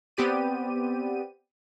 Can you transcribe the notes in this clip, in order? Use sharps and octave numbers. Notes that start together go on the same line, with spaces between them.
B3 C4 G4 D5 D#7